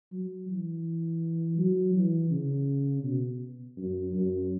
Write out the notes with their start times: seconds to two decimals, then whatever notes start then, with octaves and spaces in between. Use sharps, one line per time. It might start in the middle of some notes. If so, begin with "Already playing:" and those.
0.12 F#3
0.49 E3
1.58 F#3
1.94 E3
2.30 C#3
3.04 B2
3.77 F#2
4.13 F#2